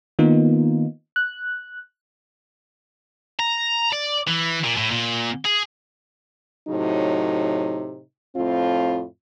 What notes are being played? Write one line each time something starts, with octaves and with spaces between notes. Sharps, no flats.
D#3 A#3 B3 D#4 F4
F#6
A#5
D5
E3
A#2
A2
A#2
G#4
A2 C3 F#3 D#4
F2 A2 C4 F4